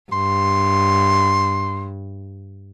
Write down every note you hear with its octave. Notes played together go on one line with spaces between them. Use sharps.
G2 C6